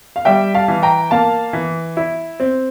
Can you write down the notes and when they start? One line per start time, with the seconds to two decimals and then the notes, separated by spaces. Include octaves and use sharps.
0.16 F5
0.25 G3 E5 G5
0.55 F5 A5
0.68 E3
0.83 G5 A#5
1.11 A#3 F5 A5
1.53 E3
1.97 E4
2.40 C4